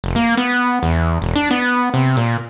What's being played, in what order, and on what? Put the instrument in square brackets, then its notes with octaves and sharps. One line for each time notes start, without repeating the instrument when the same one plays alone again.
[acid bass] F1
A#3
B3
E2
E1
D4
B3
C3
A#2